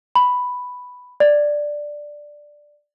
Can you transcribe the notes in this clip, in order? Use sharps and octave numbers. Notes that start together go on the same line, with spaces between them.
B5
D5